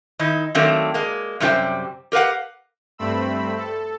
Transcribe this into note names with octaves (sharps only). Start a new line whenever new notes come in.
D#3 D#4 E4
D#3 F#3 A3 A#3 C4 D4
G#3 A#3
F#2 C3 G3 F4 C5 G5
G4 A#4 B4 F5 F#5
G2 A3 C4 B5 E6
A4